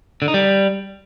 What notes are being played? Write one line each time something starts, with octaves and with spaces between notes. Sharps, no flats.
D3
D#4
G3